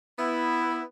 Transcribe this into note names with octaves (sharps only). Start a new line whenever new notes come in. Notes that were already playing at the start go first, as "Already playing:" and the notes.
B3 E4